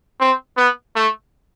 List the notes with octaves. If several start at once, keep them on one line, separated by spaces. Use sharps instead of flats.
C4
B3
A3